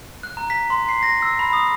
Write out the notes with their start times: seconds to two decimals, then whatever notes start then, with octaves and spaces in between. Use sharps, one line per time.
0.23 F#6
0.37 A#5
0.50 B6
0.70 C6
0.89 C7
1.03 A#6
1.22 E6
1.39 B5
1.53 D#6